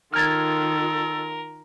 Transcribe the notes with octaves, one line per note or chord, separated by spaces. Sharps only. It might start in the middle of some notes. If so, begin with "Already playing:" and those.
D#3 F4 A4 A#4 F6 G#6 A6